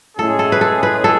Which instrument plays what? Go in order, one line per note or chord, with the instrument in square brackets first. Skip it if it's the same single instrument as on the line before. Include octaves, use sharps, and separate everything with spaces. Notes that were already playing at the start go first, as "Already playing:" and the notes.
[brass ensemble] A2 G#3 C#4 G#4 [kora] A4
[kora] A4
B4
A4
B4
A4